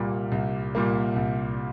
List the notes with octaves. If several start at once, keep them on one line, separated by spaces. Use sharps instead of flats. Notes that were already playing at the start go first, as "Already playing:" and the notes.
Already playing: C2 A#2 G3 A#3
C2
A#2 G3 A#3
C2